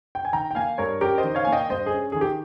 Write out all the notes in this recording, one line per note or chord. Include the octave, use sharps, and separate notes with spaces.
G5
G#5
D#3 G5 A#5
G5
A#3 F5 G#5
G2 A#4 C#5
C#4 G4 A#4
C5 D#5
D#3
C#5 F5
A#3 G#5
D#5 G5
G2 C5 D#5
G#4
C#4
D#3 G#4
G4